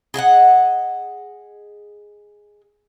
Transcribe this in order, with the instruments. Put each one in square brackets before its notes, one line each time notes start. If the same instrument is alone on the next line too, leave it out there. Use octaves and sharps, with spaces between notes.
[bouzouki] G#4 D#5 E5 F#5